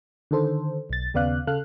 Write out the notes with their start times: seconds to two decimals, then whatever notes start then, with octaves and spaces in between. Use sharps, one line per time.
0.31 D3 D#3 A4 C5
0.90 B1 A6
1.14 D#2 C#3 B3 D5 F5 F#6
1.47 C#3 A4 F5 F6 F#6